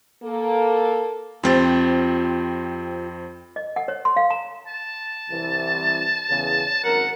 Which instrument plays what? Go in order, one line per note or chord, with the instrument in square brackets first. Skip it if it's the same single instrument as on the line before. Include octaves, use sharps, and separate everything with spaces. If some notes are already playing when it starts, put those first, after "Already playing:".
[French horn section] A#3 A4
[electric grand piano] F2 C4 A6 [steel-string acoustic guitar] F4 G4 C5
[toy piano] D#5
F#5
C#5
C6
F5
A#5
[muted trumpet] A5
[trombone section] C2 E3
E2 C#3
[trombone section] G#1 F#2 A#4 [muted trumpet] F#5